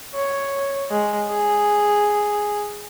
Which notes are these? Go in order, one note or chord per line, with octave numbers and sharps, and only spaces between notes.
C#5
G#3
G#4